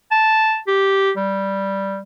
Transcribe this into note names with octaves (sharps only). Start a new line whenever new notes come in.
A5
G4
G3